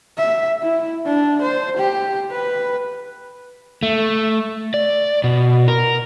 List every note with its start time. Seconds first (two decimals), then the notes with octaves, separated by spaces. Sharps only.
0.18 E5
0.62 E4
1.05 D4
1.42 C5
1.77 G4
2.31 B4
3.83 A3
4.74 D5
5.24 B2
5.68 A#4